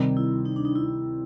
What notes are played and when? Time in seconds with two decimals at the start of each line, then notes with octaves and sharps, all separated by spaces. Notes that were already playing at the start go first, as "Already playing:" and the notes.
Already playing: C3 D#3 G3
0.17 E4
0.45 D#4
0.56 D4
0.65 D#4
0.75 E4